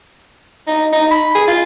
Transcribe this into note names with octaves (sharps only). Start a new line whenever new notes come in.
D#4
D#4
B5
G#4
F4